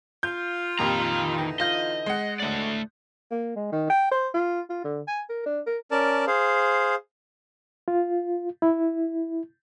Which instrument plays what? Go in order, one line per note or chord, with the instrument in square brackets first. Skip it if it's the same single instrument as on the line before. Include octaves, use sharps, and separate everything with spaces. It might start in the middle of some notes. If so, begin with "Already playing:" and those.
[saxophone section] F4 [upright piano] G6
[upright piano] F2 A#2 G4 [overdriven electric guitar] D#3 A#5
[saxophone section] D3 E3 D#4
[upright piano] F4 G6 [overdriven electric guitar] D#5
[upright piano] G#3 F#5
[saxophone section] D2 A2 [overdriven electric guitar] A3 D5
[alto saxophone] A#3
G#3
D#3
G5
C5
F4
F4
D3
G#5
A#4
D4
A#4
[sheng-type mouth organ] C#4 A#4 D5 A5
G#4 C5 F5
[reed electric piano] F4
E4